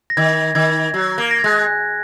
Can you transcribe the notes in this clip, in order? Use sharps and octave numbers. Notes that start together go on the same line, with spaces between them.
A#6
D#3 G#6
D#3 G#6
F#3
A#3
A#6
G#6
G#3 F#6